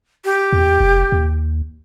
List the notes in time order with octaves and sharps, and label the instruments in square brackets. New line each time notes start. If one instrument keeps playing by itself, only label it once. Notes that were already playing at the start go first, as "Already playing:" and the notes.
[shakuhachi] G4
[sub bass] E2
F1
D#2